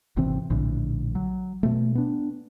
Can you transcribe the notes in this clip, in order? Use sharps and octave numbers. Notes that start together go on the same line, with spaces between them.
G#1 C3 E3 C4
A#1 A2 D3
F#3
B2 A3
B3 D4